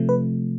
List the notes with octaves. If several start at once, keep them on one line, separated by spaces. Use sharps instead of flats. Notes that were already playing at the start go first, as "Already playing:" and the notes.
Already playing: C3 F3 A3
B4